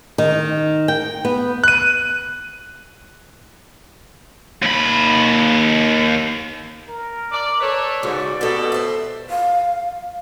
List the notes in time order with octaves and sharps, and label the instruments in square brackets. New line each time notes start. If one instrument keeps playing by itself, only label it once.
[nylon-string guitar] D#3
G5
B3
[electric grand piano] F#6 D#7
[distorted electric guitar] D#2 B5
[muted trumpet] A#4
[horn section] D5
[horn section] A4 B4 C#5 [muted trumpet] D5
[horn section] G#2 [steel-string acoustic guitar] C#3 F#4
[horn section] B2 [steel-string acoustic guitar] G4 A4
[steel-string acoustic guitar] C5 E5
[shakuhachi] F5